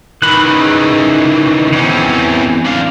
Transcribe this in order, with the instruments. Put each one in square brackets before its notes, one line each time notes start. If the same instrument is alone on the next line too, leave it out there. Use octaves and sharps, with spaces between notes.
[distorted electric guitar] D#3 E3 [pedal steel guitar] B5 F#6
[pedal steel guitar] C#3
[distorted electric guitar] E2 C#4 [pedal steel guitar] E3 C4
[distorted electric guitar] D4 F5